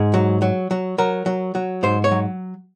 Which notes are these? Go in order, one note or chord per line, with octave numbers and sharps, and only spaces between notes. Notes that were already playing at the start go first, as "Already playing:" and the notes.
Already playing: G#2 G#4
F#3
F#3
F#3
F#3 A#4
F#3
F#3
G#2 C5
C#5
F#3